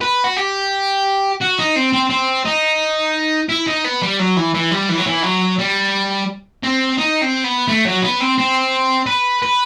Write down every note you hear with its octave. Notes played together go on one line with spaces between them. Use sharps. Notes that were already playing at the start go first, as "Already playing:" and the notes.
B4
F#4
G4
F#4
D#4
C4
C4
C4
D#4
E4
D#4
B3
G3
F#3
E3
E3
G3
E3
F#3
E3
F#3
G3
C4
D#4
C4
B3
A3
F#3
B3
C4
C4
B4
B4